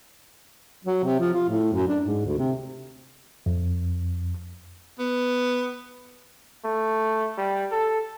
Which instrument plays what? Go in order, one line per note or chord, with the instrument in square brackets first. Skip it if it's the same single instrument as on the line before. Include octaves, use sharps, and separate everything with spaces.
[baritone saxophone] F#3
C3
F3
F4
A2
F#2
D4
G#2
D2
C3
[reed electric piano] F2
[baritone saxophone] B3
[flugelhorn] A3
G3
A4